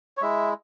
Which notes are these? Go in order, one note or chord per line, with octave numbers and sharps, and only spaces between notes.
C#5
G#3 E4 E5